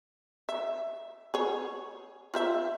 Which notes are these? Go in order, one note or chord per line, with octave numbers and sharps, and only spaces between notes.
E5
G#4 C#5
F4 C5 E5